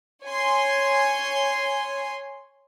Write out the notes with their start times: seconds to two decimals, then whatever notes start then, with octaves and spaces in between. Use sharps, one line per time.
0.24 C#5 G#5 C6